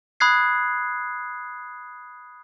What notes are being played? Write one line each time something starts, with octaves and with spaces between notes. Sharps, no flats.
B5 D#6 F#6 G#6 C7